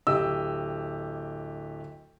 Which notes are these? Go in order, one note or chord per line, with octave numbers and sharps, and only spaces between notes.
D1 G4 D#5 E6